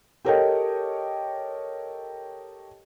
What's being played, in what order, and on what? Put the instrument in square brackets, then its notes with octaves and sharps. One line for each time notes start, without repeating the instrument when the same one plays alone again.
[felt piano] G4 A4 A#4 C#5 D#5 G5